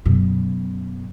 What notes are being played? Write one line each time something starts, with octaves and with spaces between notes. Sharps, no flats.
F#2 B2